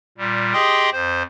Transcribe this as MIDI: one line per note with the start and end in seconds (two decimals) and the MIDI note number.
0.18 0.53 46
0.18 0.53 55
0.53 0.90 67
0.53 0.90 68
0.53 0.90 75
0.53 0.90 79
0.53 0.90 84
0.53 0.90 87
0.93 1.23 41
0.93 1.23 72